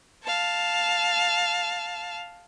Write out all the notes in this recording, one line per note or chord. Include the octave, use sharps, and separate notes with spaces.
F5 A5